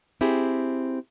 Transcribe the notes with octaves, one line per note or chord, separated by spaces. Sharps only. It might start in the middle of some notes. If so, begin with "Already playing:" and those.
C4 E4 G4 G#4